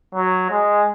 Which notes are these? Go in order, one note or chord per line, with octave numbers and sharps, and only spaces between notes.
F#3
G#3